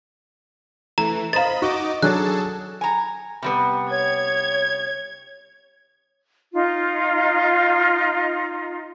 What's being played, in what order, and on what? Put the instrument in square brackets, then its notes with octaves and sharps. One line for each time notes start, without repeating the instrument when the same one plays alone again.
[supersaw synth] E3 [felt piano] A3 [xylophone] A#5
[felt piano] C5 F5 [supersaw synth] D#5 B5 [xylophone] A#5 A6
[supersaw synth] D#4 D#5 D6 [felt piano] F#4
[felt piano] F#3 D4 F#4 [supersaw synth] G#4 A4 A5 [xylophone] F#6
[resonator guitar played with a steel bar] G#5 A#5
C3 G3 B3
[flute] C#5 [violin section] G#6
[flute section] D#4 F4